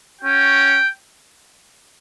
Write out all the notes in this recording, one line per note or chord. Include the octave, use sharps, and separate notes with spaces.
C#4 F#4 G5